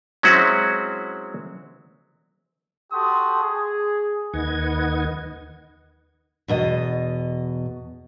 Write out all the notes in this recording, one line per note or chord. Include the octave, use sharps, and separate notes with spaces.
F#3 G#3 C4 C#4 E4 F#4
F#4 G4 A4 C6 D#6
G#4
D#2 D#3 B4 D#5 F#5 G#6
E2 B2 D#5